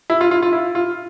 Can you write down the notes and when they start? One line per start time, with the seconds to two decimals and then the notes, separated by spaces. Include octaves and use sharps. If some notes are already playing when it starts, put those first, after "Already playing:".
0.10 E4
0.21 F4
0.31 F4
0.42 F4
0.53 E4
0.75 F4